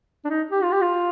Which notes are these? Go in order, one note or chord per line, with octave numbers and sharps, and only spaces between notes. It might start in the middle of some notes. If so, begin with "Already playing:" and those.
D4
D#4
G4
F4
G4
F4